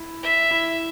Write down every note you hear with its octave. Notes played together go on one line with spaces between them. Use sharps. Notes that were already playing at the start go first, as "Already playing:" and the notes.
Already playing: E4
E5
E4